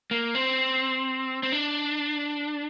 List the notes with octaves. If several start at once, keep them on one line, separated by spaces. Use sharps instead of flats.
A#3
C4
C4
D4